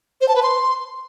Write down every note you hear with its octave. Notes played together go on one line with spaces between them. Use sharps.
C5
A5
B4
C6